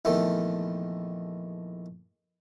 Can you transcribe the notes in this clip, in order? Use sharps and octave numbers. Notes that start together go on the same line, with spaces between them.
A#1 E2 D#3 A3